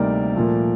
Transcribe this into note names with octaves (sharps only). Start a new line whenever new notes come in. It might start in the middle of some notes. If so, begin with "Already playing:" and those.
Already playing: D2 C3 G3 A#3 D#4 A#4 D5
A#2 F3 A3